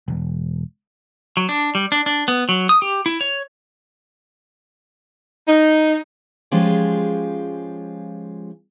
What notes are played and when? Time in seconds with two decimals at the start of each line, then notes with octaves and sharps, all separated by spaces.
0.08 E1
1.37 F#3
1.49 D4
1.75 G3
1.92 D4
2.06 D4
2.28 B3
2.49 F#3
2.69 D#6
2.82 G4
3.06 E4
3.21 C#5
5.47 D#4
6.51 F3 G#3 C#4 F4 G4 G#4